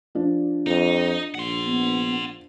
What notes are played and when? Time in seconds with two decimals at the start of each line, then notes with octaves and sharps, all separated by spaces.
0.15 F3 D4 D5
0.67 F2 D#4
1.35 A#1 F#5 C6
1.65 B3